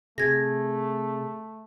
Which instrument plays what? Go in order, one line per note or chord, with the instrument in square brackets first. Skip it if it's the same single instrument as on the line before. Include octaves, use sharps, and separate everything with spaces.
[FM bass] C3 [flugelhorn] A3 [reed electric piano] G#4 [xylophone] G#6 A#6